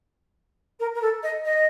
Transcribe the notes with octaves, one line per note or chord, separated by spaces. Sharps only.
A#4
A#4
A4
D#5
D#5